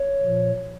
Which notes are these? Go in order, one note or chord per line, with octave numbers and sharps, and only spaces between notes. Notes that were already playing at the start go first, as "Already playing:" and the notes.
Already playing: C#5
A#2 F3